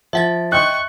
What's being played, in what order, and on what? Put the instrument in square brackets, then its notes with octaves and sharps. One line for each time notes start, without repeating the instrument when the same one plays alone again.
[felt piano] F3 [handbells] E5 F#5 A6
[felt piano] D#5 G5 C6 [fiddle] C#6 [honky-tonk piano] F#6